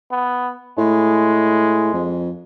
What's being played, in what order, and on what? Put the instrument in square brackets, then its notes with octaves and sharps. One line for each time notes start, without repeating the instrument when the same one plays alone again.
[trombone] B3
[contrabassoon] A2 [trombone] G#3
[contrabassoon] F2